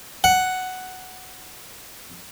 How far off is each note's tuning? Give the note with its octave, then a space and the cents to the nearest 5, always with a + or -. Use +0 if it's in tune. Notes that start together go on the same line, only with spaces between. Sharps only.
F#5 +5